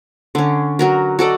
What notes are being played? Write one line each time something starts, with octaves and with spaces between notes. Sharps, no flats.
D3 C#4
F#3 F#4 A#4
F#4 A4 D5 D#5